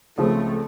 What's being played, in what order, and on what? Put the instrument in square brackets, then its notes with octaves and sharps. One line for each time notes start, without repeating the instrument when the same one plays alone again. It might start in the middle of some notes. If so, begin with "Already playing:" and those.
[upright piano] C#2 C#3 F3 G#3 C4 [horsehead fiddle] A3